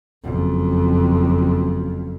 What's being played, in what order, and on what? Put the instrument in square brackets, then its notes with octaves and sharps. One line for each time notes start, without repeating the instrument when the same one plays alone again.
[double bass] F#1 F2